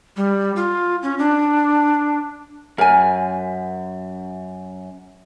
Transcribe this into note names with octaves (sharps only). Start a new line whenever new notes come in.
G3
F4
C#4
D4
F#2 A#4 G#5